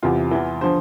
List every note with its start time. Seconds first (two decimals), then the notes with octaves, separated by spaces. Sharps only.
0.03 E2 C3 E3 F4
0.31 E2 E3
0.61 D3 F3 C5